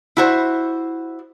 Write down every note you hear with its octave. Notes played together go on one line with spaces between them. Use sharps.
E4 F#4 C5